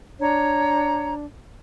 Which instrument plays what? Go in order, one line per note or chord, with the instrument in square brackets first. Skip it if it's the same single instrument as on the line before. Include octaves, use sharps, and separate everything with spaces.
[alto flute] D4 [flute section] C#5 A#5